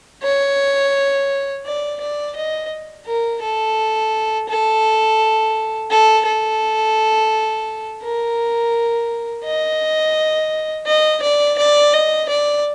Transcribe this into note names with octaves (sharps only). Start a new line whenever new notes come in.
C#5
D5
D5
D#5
A#4
A4
A4
A4
A4
A#4
D#5
D#5
D5
D5
D#5
D5